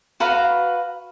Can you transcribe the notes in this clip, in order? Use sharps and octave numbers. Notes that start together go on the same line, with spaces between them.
F#4 B4 F5 A#5